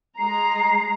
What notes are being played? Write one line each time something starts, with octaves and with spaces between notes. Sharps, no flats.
G#3 A#5 C7